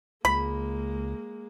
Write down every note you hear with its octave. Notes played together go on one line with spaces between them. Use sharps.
C#2 G#3 A#3 B5